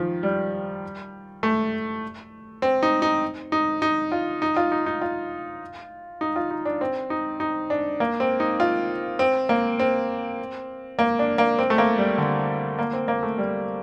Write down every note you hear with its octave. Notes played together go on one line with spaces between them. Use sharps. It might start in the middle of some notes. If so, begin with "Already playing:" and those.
Already playing: D#3 F3
G3
A3
C4
D#4
D#4
D#4
D#4
F4
D#4
F4
D#4
D#4
F4
D#4
F4
D#4
D4
C4
D#4
D#4
D4
A#3
C4
D#4
F4
C4
A#3
C4
A#3
D4
A#3
C4
A3
A#3
G3
D3
A#3
C4
A#3
A3
G3